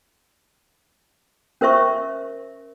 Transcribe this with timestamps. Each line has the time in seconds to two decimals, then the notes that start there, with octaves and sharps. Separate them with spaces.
1.61 C#4 A#4 C5 E5 C#6